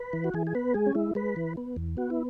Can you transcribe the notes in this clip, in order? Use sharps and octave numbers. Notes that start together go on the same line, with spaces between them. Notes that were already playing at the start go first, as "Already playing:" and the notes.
Already playing: B4
E3
F#4
E3 G#4
G#4
B3 B4
G#3 G#4
C#4
G#3 E4
G#3 B4
E3
B3
E2
B3 F#4
E4